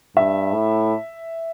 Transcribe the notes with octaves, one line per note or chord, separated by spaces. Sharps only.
G2 E5
A2